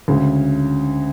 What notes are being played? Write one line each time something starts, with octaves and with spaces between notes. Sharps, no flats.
D2 C#3 G#3